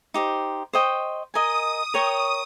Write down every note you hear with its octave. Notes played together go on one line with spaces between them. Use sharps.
D#4 G4 C5
C5 D#5 G5 C#6
A#4 D#5 G#5 D#6
A#4 C#5 G5 C#6